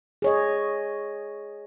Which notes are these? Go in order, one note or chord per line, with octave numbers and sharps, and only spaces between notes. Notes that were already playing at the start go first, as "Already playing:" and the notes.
G#4 C#5 D#5